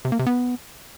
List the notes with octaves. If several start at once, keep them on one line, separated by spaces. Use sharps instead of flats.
C3
A#3
C3
B3